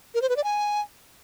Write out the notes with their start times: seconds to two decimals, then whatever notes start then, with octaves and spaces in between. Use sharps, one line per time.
0.15 A#4
0.22 C5
0.29 B4
0.37 D5
0.44 G#5